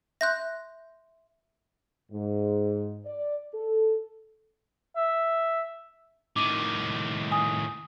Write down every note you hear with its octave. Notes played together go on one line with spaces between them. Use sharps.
E5 C6 F#6 G6 A#6
G#2
D5
A4
E5
A2 D#3 D6 D#7
G#5 D#6